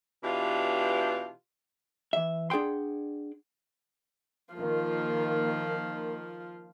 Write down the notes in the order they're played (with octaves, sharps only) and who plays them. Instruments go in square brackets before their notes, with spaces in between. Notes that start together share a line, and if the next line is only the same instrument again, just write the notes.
[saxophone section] B2 E3 D4 F4 G4
[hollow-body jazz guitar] E3 E5
D4 G#4 F#5 G5 C6
[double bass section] D#3 A#3 [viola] F3 F4